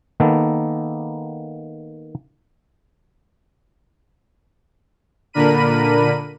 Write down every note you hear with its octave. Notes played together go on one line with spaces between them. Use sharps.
D#3 A#3 B3 A4
A#2 D3 D4 A#4 B5 D#7